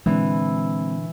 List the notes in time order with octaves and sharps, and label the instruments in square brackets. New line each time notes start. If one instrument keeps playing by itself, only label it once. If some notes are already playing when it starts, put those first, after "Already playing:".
[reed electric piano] A#2 D3 D4 [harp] E3 [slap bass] G#3 A#3 C4